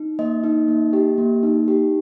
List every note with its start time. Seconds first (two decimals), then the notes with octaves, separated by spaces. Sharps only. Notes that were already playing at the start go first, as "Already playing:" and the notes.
Already playing: D#4
0.19 A#3 D#5
0.44 D#4
0.68 A#3
0.93 G4
1.18 A#3
1.43 D#4
1.68 G4